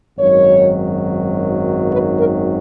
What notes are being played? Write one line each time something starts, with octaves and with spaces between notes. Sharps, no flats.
G#1 F#2 D#3 F#3 C#5
B4
A#4